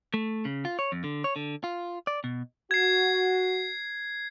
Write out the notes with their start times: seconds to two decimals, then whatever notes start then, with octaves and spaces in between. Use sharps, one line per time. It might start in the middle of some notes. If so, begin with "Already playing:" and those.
0.14 A3
0.45 C#3
0.65 F4
0.79 C#5
0.92 F2
1.04 D3
1.24 C#5
1.36 D3
1.64 F4
2.07 D5
2.24 B2
2.71 F#4 G#6 C7